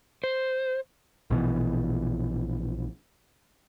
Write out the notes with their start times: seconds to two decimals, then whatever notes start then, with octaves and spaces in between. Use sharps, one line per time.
0.24 C5
1.30 A#1 B2 E3